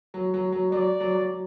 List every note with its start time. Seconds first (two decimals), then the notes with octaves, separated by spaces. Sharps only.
0.14 F#3
0.34 F#3
0.52 F#3
0.72 F#3 D5
1.00 F#3
1.15 F#3
1.29 F#3